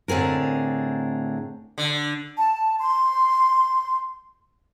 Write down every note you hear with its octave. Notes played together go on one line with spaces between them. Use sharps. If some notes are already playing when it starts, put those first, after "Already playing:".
A2 D3 C4 G#4 A#4
D3
A5
C6